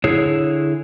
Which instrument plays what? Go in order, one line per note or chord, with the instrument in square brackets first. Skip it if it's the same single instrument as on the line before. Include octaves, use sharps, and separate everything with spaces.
[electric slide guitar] D3 E4 G#4 C#5